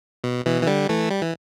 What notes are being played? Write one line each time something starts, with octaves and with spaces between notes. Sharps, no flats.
B2
B2 E3
E3
D3 G3
E3 A3
G3
E3